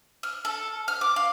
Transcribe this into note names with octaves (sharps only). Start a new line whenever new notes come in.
F6
A4
F6
D6
F5